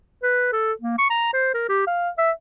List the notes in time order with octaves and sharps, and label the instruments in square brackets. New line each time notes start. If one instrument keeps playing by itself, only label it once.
[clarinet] B4
A4
A#3
C#6
A#5
C5
A#4
G4
F5
E5